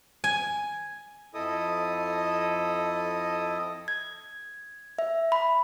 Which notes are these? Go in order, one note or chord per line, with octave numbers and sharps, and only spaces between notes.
G#5
F2 E4 A4 D#5 D#6
G#6
E5
B5